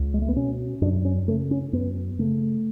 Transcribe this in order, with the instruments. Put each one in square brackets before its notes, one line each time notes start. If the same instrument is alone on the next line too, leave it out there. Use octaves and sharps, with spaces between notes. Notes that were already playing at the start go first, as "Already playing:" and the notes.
Already playing: [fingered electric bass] C#2
G#3
A3
B3
B2 C#4
F#2 D4
C#4
C#3 A3
C#4
F#2 B3
C#3 A3